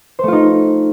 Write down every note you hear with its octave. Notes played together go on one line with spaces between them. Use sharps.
A3 D#4 F4 C5